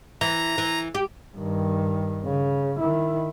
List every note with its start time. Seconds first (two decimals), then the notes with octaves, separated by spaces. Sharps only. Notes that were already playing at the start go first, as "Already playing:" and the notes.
0.21 E3 A#5
0.58 E3
0.95 G4
1.36 G2 D#3
2.25 C#3
2.80 D#3 E4